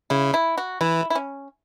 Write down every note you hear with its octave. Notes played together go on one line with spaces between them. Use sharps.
C#3 E4
E4
F#4
E3 E4
E4
C#4